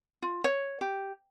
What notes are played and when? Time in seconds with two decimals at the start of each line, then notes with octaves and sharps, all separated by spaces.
0.22 F4
0.44 C#5
0.81 G4